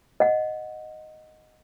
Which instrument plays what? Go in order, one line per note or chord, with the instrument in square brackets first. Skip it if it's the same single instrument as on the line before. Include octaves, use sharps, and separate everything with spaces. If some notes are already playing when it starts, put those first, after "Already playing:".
[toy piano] D#5 F#5